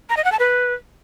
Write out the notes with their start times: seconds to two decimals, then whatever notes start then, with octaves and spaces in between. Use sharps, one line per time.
0.09 A#5
0.17 D#5
0.24 F#5
0.32 A5
0.39 B4